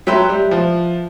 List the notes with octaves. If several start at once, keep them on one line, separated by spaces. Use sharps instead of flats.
F#3 B4 E5 G5 C6
G3
F3